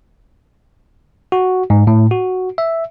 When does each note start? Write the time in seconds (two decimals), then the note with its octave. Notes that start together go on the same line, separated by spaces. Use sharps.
1.32 F#4
1.70 G#2
1.87 A2
2.11 F#4
2.58 E5